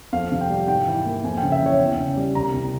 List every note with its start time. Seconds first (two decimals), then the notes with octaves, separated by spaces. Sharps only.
0.13 F2 F5
0.31 C3
0.41 G5
0.50 G3
0.68 G#2 G5
0.87 E3
1.05 A#3
1.24 F2 G#5
1.37 C#3 G5
1.52 E5
1.61 E3
1.66 C#5
1.80 E2 G5
1.98 C#3
2.17 G3
2.35 C2 A#5
2.54 C3